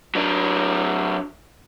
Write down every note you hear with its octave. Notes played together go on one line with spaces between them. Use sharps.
F#3 D4